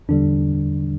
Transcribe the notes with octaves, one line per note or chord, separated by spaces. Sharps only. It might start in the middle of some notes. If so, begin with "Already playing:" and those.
E2 D3 G3 D4